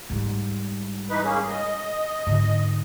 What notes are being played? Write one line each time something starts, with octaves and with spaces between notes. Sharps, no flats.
G#2 G3
E3 D#4 B4
A#3 C#4 G#4
D#5
G#2 D3